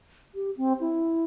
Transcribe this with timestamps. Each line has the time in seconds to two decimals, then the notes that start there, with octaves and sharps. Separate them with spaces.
0.35 G4
0.57 C4
0.80 E4